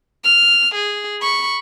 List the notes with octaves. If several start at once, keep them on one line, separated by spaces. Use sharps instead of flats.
F6
G#4
B5 C#6